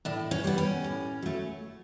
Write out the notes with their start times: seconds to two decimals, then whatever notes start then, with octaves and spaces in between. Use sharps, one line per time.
0.05 A2 D4
0.31 C#4
0.44 G3 B3
0.58 C#4
0.84 A2
1.22 F#3 A3